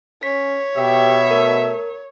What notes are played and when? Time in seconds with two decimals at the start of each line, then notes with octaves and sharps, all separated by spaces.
0.23 C#4 C#5 B6
0.76 B2 G4 E5
1.31 A3 A#4